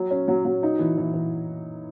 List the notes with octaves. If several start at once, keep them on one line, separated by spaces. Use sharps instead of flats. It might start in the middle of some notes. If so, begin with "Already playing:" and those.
Already playing: F#3
C#4
F#3
F#3
D#4
E3
E3
E3